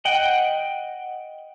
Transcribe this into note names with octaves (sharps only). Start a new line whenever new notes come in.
D#5 F#5 G5